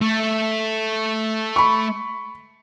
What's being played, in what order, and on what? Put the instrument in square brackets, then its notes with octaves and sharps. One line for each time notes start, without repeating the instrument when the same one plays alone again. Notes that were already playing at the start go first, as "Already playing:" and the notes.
[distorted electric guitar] A3
[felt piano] B5 C#6